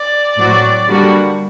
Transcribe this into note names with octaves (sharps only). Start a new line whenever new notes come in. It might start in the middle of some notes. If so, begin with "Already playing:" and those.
Already playing: D5
A2 F#3 C4 F#4
D3 G3 A#3 F#4